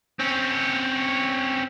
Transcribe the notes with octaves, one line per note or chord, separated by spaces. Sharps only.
C4 C#4